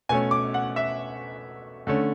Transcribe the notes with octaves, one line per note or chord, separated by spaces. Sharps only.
B2 A3 C#4 G#5
D6
F#5
E5
D3 A3 C#4